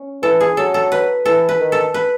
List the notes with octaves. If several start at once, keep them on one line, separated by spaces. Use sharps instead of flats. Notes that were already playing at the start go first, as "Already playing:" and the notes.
Already playing: C#4
E3 A4
G#4
F#3 A4
A4
B4
E3 A4
B4
D#3
A4
B4